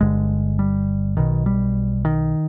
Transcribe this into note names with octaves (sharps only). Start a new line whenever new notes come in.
G1 G2 D3 G#3
G3
B1 B2 D#3
G3
D#3